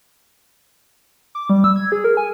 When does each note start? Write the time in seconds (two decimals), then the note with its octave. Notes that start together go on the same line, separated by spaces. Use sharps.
1.35 D6
1.50 G3
1.64 E6
1.76 G#6
1.92 G#4
2.04 A#4
2.17 G#5